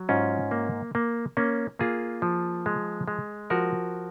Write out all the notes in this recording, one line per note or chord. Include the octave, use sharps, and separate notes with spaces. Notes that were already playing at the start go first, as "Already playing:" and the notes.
Already playing: F#3
G#2 C#4 F4
A#3
A#3
A#3 C#4
A#3 F4 G#4
F3
G#3
G#3
F3 F#4 A#4